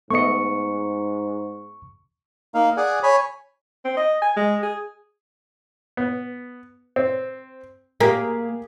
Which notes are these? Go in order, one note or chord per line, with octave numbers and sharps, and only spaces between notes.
G#2 A3 B3 D#5 C#6 C#7
A#3 D#4 F5
G#4 D5 F#5 G#5
C#5 G#5 B5
C4
D#5
G#5
G#3
G#4
B3
C4
A#3 G4 G#4